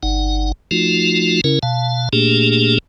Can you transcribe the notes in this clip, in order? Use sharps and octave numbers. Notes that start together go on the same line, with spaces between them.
G1 D#4 F#5
F3 A3 D#4 F4 F#4
C#3 C#4 E4 A#4
B2 F5 A5
A#2 A3 A#3 D4 G4 G#4